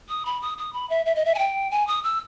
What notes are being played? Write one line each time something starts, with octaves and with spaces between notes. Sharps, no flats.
D#6
B5
D#6
D#6
B5
E5
E5
D#5
E5
G#5
G5
G#5
D#6
E6